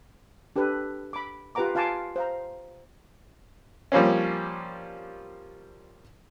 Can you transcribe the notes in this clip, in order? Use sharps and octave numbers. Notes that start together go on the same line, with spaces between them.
D4 G4 A4 B4
B5 D6
F4 G4 B4 F#5 A#5 D6
F4 F5 G#5 A5 C6 D6
C5 F5 A#5
F3 G3 A#3 C4 C#4